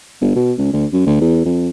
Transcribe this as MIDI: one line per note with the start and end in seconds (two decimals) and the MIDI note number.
0.21 0.32 31
0.36 0.53 47
0.58 0.72 37
0.73 0.86 38
0.93 1.05 42
1.06 1.16 38
1.21 1.41 40
1.45 1.69 41